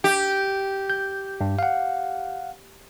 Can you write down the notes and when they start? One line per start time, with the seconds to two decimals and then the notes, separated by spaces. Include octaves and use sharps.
0.04 G4
0.90 G6
1.41 G2
1.59 F5 F#5